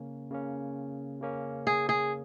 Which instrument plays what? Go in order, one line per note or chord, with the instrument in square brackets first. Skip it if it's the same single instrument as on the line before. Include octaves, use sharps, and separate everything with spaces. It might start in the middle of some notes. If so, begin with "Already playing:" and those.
Already playing: [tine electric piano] C#3 A#3 C#4
C#3 A#3 C#4
C#3 A#3 C#4
[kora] G#4
G#4